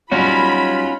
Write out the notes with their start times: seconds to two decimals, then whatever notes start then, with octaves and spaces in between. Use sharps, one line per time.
0.11 F#3 G3 C#4 D#4 F4 F#4 C#5 B5